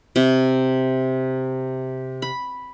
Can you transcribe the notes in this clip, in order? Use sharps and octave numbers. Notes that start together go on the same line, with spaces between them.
C3
B5